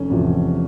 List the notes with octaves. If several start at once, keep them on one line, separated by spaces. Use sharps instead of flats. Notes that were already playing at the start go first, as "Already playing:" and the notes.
Already playing: F1 C#4
E2 C3 F3